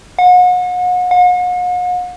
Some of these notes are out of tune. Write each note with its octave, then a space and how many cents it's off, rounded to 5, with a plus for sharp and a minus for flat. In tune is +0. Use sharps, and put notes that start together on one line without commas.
F#5 -35
F#5 -45